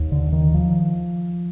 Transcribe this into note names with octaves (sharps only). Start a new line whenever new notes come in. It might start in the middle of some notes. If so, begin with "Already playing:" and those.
Already playing: D#2
D3
D#3
F3